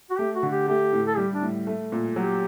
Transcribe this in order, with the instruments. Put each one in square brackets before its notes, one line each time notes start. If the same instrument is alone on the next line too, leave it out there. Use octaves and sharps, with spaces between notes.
[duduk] F#4
[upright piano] A3 [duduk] G4
[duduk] F#4
[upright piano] D3
[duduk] G4
[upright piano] A3 [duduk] G4
[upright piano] A2
[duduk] A4
[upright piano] G3 [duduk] G4
[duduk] D4
[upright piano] A2
A3
A#2
[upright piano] F#3 [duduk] G4